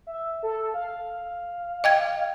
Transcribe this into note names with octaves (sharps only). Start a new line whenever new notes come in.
E5
A4
F5
D#5 G5 G#6